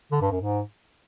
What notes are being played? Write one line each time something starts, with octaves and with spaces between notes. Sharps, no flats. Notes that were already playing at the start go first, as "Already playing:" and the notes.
D3
G2
F#2
G#2